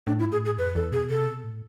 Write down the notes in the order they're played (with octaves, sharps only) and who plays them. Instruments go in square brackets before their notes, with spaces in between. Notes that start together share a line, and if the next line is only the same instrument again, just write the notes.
[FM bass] A2 [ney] D4
[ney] E4
[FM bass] G#2
[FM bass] A2 [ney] G#4
[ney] G#4
[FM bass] F2 [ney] B4
[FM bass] E2 [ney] A4
[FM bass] B2 [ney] G#4
[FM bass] C3 [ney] A4
[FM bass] B2
A2